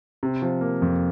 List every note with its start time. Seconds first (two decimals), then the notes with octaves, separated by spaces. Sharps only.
0.23 C3
0.42 F3
0.61 A#3
0.82 F2